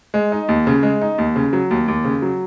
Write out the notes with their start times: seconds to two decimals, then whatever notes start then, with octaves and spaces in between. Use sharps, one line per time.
0.14 G#3
0.32 D#4
0.48 D#2
0.67 C#3
0.83 G#3
1.01 D#4
1.18 D#2
1.36 C#3
1.53 F#3
1.71 D#2
1.88 D#2
2.04 C#3
2.22 F#3